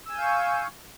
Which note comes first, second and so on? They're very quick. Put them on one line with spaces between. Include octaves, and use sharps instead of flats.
E6 G#5 G6 F5 C#6